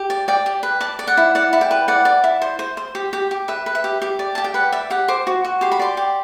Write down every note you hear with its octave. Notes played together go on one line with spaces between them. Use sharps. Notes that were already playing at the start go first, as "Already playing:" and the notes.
Already playing: G4
D5
D5 G5
G4
B4
D5 A5
D5
F#5
E4
D5 F#5
E4
G5
B4
D5 F#5
D5
E4
C5
C5
C5
G4
G4
G4
B4 E5
B4
E5
G4
G4
D5
G4 A5
G5
B4 F#5
D5 E5
G4 F#5
C5 D6
F#4
F#4
G4 C6
B5
D5 C6
G4